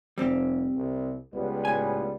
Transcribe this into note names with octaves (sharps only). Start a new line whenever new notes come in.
F1 G3 C4 G4
C2
C#2 G3 B3
A2 G#5